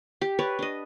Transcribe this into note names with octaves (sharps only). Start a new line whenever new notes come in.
G4
B4 C#5 D5
D4 D#5